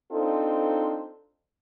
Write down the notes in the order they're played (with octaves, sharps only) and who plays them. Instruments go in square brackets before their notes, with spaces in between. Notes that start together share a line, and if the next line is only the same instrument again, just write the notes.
[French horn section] C4 D4 D#4 F4 A4 C5